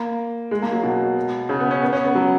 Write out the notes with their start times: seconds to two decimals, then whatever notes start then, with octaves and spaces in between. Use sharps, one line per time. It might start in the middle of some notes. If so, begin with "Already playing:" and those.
Already playing: A#3
0.51 G#3
0.62 A#3
0.72 F#3
0.83 B2
1.49 C#3
1.60 B3
1.71 C#4
1.82 B3
1.93 C#4
2.04 B3
2.15 F#3